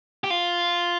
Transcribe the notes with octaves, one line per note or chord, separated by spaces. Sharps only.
G4
F4